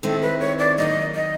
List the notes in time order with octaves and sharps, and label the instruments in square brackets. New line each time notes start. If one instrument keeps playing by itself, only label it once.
[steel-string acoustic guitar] D#3 G#3 C4 E4 [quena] A4
[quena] B4
C#5
D5
[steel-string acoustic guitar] D#3 F#3 A#3 [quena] D#5
[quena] D#5